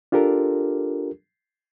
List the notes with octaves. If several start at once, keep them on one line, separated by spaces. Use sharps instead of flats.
D4 F4 G4 A4 A#4